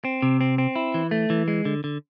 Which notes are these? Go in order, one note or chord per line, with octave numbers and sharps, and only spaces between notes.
C4
C3
C4
C4
E4
E3
A3
E3
G#3
D3
D3